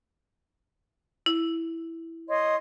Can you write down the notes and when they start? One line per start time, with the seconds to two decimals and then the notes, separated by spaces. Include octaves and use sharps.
1.26 E4
2.28 C#5 D#5 C6